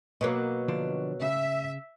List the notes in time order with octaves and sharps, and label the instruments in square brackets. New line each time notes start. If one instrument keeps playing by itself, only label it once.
[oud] B2 F#3 A#3
[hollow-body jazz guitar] D3 F3 D4
[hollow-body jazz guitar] C#3 [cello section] E5